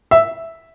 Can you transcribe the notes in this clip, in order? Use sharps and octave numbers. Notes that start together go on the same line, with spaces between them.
E5